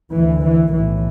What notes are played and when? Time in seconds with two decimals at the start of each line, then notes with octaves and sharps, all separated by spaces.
0.13 D2 E3
0.43 E3
0.72 B1 A2 E3